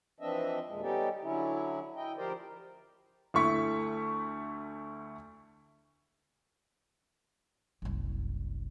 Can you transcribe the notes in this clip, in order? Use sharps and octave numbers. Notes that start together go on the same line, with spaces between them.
E3 F3 C4 D4 D#5 E5
D#2 A#2 G#3
G3 B3 C#4 D#4 G4 A4
D3 F#3 C#4 E4
E4 D#5 G5
D2 F3 G4 A#4 C5 D5
D2 A3 E4 C#6 B6 C#7
F#1 C2